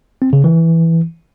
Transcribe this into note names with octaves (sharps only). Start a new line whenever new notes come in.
C4
C#3
E3